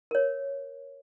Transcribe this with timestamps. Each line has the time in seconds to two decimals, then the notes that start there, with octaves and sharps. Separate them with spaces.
0.11 A#4 C#5